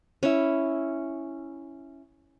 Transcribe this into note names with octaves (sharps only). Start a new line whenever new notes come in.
C#4 E4